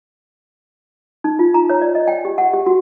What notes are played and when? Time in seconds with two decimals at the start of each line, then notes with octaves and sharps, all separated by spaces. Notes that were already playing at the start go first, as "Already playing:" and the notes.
1.24 D#4
1.39 F4
1.54 A#5
1.70 C#5
1.81 D5
1.95 D#5
2.07 G5
2.25 G4
2.38 F#5
2.54 G4
2.66 F#4